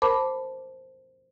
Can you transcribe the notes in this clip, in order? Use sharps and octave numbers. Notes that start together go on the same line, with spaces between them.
A#4 C5 A5 B5 D6